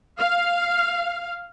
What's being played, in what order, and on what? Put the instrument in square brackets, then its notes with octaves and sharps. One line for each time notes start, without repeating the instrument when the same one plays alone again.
[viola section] F5